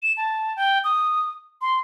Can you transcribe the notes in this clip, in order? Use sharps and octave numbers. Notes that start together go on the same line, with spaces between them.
E7
A5
G5
D#6
C6